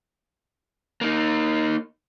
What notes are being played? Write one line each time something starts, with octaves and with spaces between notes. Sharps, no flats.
A#3 D#4